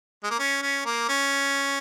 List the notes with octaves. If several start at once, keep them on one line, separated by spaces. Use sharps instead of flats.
G#3
A#3
C#4
C#4
A#3
C#4